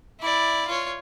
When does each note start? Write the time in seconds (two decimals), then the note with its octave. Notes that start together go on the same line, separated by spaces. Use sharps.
0.20 E4 D5
0.68 F4 C#5